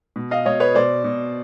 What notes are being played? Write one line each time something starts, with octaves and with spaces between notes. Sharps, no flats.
B2
D#5 F5
B2 C#5 D#5
B4 C#5
B2 C5 D5
B2